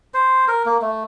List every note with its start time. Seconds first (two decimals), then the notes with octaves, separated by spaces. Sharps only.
0.14 C5
0.48 A#4
0.66 A#3
0.82 A3